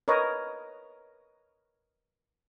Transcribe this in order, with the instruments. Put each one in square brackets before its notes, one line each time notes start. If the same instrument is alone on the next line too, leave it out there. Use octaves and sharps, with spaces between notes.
[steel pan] A#4 B4 C#5 D#5